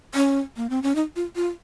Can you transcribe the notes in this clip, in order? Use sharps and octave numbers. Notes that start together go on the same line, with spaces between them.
C#4
A#3
C4
C#4
D#4
F4
F4